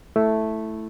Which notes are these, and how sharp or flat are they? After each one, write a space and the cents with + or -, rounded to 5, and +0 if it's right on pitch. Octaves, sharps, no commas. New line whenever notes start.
A3 +0 E4 +0